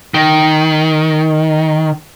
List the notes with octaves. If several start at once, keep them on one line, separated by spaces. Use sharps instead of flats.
D#3